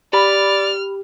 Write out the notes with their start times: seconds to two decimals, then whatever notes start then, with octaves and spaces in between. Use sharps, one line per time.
0.13 G4 D5 B5 F6